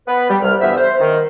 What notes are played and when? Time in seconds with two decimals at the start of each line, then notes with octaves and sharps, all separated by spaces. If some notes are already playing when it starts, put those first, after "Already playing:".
0.08 B3 B4
0.30 G3
0.42 C2 F6
0.61 D2 G2 E3 B3 E5
0.77 C5
1.00 D#3